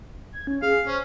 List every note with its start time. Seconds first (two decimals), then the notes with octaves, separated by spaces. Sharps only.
0.32 G#6
0.47 C#4
0.62 G#4 F5
0.87 C#4 C5